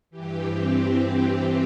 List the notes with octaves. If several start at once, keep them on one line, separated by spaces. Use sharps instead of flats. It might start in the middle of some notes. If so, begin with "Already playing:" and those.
G2 E3 G4
C4
C4
C4